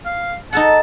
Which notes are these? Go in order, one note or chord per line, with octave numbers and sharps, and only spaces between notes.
F5
D#4 A4 F#5 A5